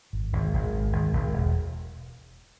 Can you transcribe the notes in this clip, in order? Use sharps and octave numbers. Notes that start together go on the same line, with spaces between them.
G#1
G#1
G#1
G#2
G#1
G#1
E1